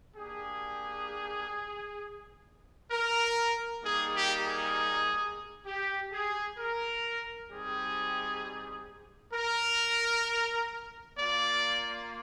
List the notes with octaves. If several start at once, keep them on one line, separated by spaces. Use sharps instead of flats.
A#3 D4 G4 G#4
A#4
G3 A#3 D#4 G#4
G4
G#4
G4
G#4
A#4
G3 C4 D#4 G4 G#4
A#4
A#3 F4 D5